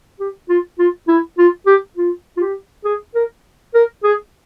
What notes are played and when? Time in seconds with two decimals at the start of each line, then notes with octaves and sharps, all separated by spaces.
0.20 G4
0.49 F4
0.79 F4
1.08 E4
1.38 F4
1.66 G4
1.97 F4
2.37 F4
2.40 G4
2.85 G#4
3.15 A#4
3.74 A#4
4.04 G#4